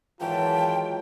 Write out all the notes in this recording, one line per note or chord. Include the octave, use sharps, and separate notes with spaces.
G#2 D#3 E3 F#3 F4 G5 A5